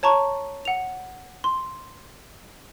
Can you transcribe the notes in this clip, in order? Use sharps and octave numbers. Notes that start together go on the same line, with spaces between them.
C#5 A5 A#5 C#6
F#5 F7
C6